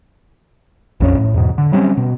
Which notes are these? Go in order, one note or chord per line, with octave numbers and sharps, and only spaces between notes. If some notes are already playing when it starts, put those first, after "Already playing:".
A#1 F2 D#3 C#4
A2
E2 G#2 B2
D3
F#3 G3 C4 C#4
B2